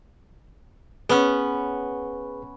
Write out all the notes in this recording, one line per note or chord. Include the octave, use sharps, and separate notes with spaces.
B3 C#4 G#4 B4 F#5